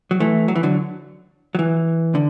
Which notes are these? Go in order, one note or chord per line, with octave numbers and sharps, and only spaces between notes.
F#3
E3 A3
F#3
E3
D3 F#3
F#3
E3
D3